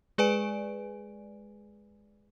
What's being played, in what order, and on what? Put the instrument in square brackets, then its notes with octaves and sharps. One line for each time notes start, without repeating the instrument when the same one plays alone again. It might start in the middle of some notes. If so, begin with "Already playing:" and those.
[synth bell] G#3 G#4 B4 D5 G#5 D7